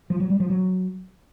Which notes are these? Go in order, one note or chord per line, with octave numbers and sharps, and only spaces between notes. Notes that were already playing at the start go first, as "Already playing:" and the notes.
F3
F#3
G3
F3
F#3